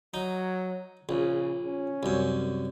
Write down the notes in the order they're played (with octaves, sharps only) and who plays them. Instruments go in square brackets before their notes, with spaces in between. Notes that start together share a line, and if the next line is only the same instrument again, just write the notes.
[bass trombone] F#3 [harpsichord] D#4
[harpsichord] A#1 [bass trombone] C#3
[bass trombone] C#4
[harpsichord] C2 F#2